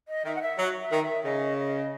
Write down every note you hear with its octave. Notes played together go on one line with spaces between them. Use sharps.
D#5
D#3 E5
F#5
E5
F#3
E5
D#3
E5
C#3 D#5
D#5